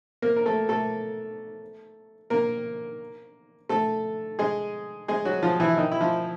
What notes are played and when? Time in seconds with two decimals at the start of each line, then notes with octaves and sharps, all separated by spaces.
0.22 A#3 A#4
0.36 A#4
0.46 A3 A4
0.69 A3 A4
2.30 A#3 A#4
3.69 A3 A4
4.39 G#3 G#4
5.08 G#3 G#4
5.25 F#3 F#4
5.43 F3 F4
5.60 E3 E4
5.77 D#3 D#4
5.92 E4
6.01 F3 F4